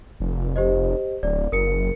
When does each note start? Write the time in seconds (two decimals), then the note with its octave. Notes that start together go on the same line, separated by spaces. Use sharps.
0.20 F1
0.56 G4 C5 D#5
1.23 D1 D5
1.52 F#1 A#4 C#7